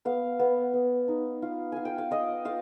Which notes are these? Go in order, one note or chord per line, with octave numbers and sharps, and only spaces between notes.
B3 F5
B3
B3
D#4
F4
F4 G#5
G5
F5
F4 D#5
F4 F5